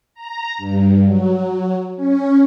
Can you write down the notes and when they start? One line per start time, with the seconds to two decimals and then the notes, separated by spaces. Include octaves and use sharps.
0.14 A#5
0.58 G2
1.04 F#3
1.97 C#4